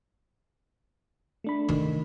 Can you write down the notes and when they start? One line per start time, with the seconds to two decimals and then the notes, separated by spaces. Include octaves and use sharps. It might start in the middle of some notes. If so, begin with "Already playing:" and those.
1.44 A3 D4 B5
1.69 D#3